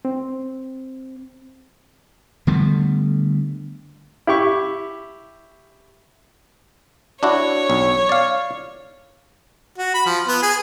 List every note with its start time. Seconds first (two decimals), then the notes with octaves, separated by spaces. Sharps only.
0.05 C4
2.47 D3 G3 A3 B3
4.27 E4 G4 C#6
7.23 D4 E4 F#4 C#5
7.70 B1
8.09 D5 F5
9.78 F#4
9.94 B5
10.06 F3
10.28 B3
10.42 G#4